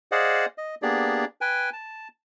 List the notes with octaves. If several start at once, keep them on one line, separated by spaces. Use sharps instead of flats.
G#4 C5 D5 D#5 F5 F#5
D#5
A#3 B3 D4 G4 G#4 D5
B4 G5 G#5
A5